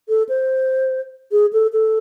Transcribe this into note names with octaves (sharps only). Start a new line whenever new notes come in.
A4
C5
G#4
A4
A4